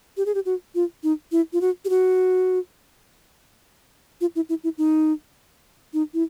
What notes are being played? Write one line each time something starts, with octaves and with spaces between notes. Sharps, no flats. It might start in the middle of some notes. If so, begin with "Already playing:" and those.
G4
G#4
G4
F#4
F4
D#4
E4
F4
F#4
G4
F#4
F4
E4
E4
E4
D#4
D#4
E4